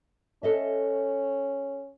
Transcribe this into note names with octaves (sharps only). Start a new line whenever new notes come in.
C#4 A4 D#5 E5